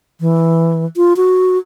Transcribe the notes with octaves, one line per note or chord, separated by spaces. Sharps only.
E3
F4
F#4